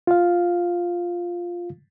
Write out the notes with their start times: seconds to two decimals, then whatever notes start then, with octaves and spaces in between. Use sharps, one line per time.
0.07 F4 F5